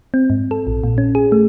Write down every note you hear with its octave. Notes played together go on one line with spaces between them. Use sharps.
C4
G#2
A4
A#1
A#2
C#4
G#4
A3